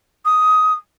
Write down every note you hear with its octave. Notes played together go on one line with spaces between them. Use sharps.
D#6